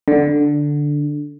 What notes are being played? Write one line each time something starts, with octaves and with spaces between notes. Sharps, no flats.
D3